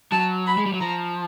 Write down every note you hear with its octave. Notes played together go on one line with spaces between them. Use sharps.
F#3 A5
B5
G#3
G3
F#3
F3 A#5